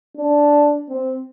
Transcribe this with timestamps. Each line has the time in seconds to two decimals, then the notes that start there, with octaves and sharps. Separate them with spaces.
0.17 D4
0.89 C4